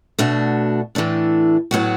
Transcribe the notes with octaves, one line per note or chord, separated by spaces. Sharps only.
B2 A3 D4 F#4
A2 E3 A3 D4
A2 F#3 B3 F#4